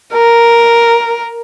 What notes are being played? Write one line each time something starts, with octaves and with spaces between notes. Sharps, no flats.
A#4